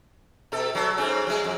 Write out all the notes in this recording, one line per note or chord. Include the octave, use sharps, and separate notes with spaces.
B2 A4
F#3 A4
G#2 C4 C#4
F#3 G#3
F2